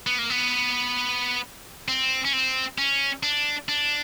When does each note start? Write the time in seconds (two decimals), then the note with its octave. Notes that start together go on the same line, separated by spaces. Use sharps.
0.07 B3
0.19 A#3
0.30 B3
1.88 C4
2.25 C#4
2.33 C4
2.78 C#4
3.23 D4
3.69 D4